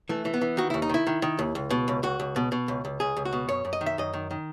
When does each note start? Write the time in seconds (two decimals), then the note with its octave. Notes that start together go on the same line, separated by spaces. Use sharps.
0.09 E3 A3
0.25 E3
0.34 B3
0.41 E3
0.57 D#3 F#4
0.70 D#2 E4
0.82 D#4
0.89 D#3 E4
1.07 D#3
1.22 D#3
1.39 D#2
1.55 C#2
1.70 B2
1.88 C#2
2.03 C#2 F#4
2.20 C#2
2.36 B2
2.52 B2
2.68 C#2
2.85 C#2
3.00 C#2 G#4
3.17 C#2
3.25 F#4
3.33 B2
3.49 F#2 C#5
3.65 F#2
3.73 D#5
3.81 D#3
3.86 E5
3.98 F#2 D#5
4.14 D#3
4.31 D#3